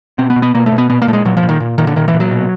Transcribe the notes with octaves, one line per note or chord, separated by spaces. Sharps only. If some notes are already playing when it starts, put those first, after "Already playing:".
B2 C4
B3
B2
B3
B2 A#3
A3
B2
B3
A#2 B3
A#3
A#2 A3
G#3
A#2 F#3
F3
A#2
D#3
A#2
A#2 D#3
D3
A#2 D#3
E3
A#2
F#3
B2